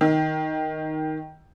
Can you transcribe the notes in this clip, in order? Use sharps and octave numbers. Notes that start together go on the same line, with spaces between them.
D#3